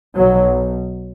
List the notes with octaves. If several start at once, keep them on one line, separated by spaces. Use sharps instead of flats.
B1 B2 F#3